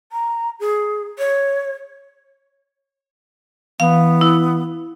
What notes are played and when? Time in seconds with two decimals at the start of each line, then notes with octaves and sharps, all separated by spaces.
0.12 A#5
0.60 G#4
1.19 C#5
3.80 E3 B3 F5
4.21 E4